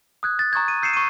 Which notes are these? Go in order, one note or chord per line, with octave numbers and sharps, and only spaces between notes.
D#6 F#6 G#6
A6
A#5 C#6 D#6 G#6
D#7
E6 G6 C7 C#7 D#7 E7
C#6 D#7